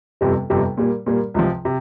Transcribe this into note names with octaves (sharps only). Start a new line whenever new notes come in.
G1 F2 C3 G3
G1 F2 C3 G3
A#2 G3 A#3
A#2 G3 A#3
C#2 C3 F3
C3